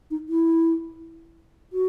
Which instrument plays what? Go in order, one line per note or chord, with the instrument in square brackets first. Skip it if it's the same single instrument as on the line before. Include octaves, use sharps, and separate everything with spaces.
[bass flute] D#4
E4
F#4